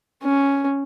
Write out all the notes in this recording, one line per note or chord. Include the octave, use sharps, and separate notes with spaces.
C#4